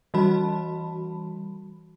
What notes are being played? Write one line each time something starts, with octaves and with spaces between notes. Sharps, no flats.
E3 G3 F#4 A5 B5